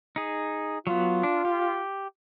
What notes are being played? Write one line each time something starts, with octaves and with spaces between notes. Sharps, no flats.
D#4 G#4
F#3 B3 F4
D4
G4